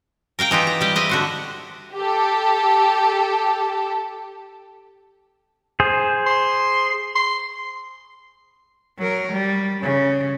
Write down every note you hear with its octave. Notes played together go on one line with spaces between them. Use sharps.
A#4 F5 G5 A#5
E3 D#4 F4 G4
A#5
G3 G4
C5 D#5 E5
D3 F#4 C5
G4 A4
G#4 C5
C6
C6
F#3 A#4
G3
C#3 C#4